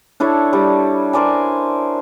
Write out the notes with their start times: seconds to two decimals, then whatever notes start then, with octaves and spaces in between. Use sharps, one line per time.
0.20 D4 E4 A4 C#5
0.53 G3
1.13 A#4 C5 D5 G#5